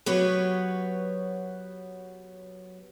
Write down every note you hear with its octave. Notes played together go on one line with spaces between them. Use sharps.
F#3 B3 G4 B4 C#5